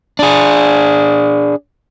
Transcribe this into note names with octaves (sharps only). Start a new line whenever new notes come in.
D4 G#4